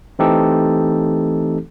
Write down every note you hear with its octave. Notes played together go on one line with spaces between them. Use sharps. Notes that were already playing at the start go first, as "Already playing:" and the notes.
E3 A3 C4 D#4 G4 A4